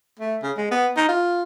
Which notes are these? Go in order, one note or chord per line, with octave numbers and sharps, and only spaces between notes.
A3
C#3
G#3
B3
D#4
F4